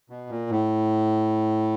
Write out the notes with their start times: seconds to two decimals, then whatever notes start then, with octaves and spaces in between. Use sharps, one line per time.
0.10 B2
0.30 A#2
0.50 A2